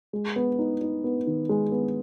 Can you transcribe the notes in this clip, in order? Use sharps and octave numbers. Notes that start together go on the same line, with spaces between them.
G#3
B3
D#4
D#4
B3
D#3
G#3
B3